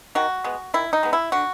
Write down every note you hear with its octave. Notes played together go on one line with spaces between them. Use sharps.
D#3 F#4
G#3 B3
D#3 E4
D#4
G#3 B3
E4
D3 F#4